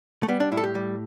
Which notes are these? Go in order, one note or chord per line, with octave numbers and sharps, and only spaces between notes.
A3
G3 B3
D4
A2 E4
A4
G4
G3